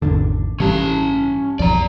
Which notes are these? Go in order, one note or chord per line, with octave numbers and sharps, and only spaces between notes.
G#1 E2 D3 D4
A1 G2 C#3 E3 C#4 A5
B1 F2 F3 D5 A#5